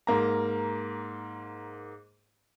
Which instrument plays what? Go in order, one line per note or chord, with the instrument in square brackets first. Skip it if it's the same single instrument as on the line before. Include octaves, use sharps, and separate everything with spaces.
[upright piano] G#2 A#3 A#5